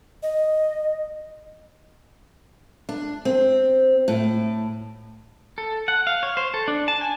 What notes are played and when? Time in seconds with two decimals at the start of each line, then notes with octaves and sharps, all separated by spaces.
0.23 D#5
2.89 D4
3.25 C4
4.08 A2
5.58 A4
5.88 F#5
6.07 F5
6.23 C#5
6.37 C5
6.54 A4
6.68 D4
6.88 A5
7.01 G#5